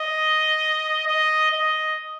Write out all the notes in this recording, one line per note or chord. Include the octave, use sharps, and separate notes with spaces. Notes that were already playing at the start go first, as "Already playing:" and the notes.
Already playing: D#5
D#5
D#5